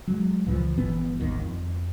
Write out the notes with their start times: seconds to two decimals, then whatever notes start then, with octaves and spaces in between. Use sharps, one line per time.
0.07 F#3 G#3
0.46 C#2 A#2 E3 F3
0.78 G1 A#2 E3 B3
1.20 G#1 D#2 D#3
1.44 F2